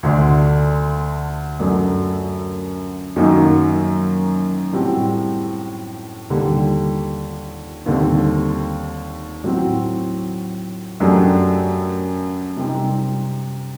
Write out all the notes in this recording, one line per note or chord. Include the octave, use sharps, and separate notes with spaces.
D2 D3 A3 D4
F#2 F#3 A3 D4
F#2 D#3 F#3 A#3 D#4
A2 G3 C4 F#4
D#2 D3 G3
D#2 D3 G3 C4
A2 F#3 C4 F#4
F#2 F#3 A3 D4 G4
C3 G3 C4 D#4